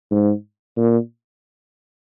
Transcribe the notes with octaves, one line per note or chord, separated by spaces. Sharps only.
G#2
A#2